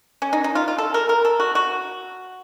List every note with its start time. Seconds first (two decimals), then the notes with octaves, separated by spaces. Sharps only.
0.22 C#4
0.33 D#4
0.44 D#4
0.55 F4
0.68 F4
0.78 A4
0.94 A#4
1.09 A#4
1.25 A4
1.40 F#4
1.55 F#4